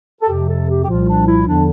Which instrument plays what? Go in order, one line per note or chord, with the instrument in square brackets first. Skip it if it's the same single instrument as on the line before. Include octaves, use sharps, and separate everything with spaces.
[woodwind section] A4
F2 C3 F3 G4
A4
G4
G4
C2 A#2 F3 F4
D4
E4
E2 D3 F3 D4